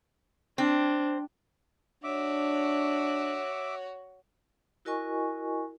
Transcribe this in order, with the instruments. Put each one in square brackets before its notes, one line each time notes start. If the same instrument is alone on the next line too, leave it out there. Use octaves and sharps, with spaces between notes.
[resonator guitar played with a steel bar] C4 [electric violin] D4
[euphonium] D4 [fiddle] F#4 C#5 [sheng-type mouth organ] E5 D6
[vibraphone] E4 F#4 A#4 D#5 G#5 C#6